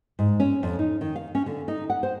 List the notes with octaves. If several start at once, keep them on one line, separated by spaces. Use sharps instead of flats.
G#2
C#4
F2
D#4
D#3
F5
C#4
D3
D#4
F#5
C5